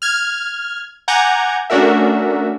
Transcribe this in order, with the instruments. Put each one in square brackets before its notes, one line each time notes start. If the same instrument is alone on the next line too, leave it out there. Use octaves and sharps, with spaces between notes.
[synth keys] F6 G#6
F#5 G#5 A#5 D6 G6 G#6
A3 C#4 D4 F#4 A#4 E5